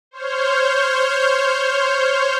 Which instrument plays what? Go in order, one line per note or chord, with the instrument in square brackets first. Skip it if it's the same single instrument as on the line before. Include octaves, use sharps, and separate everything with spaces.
[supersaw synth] C5 C#5 F6 G6